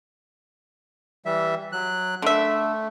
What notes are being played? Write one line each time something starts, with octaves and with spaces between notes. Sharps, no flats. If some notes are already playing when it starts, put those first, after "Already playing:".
E3 G3 E5
F#3 F#6
D3 A3 E5